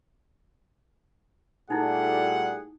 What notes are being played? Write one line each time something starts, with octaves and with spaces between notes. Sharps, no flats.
A#2 G3 A3 D#4 E4 G#4 F#5